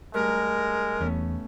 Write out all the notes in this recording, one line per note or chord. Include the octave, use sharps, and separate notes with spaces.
G2 G#3 A3 A#4 A#5
E2 A3 B3 C#4